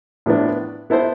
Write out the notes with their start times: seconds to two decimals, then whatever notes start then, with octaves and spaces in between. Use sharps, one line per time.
0.26 A2 F3 B3 D4
0.90 B3 E4 A4 C5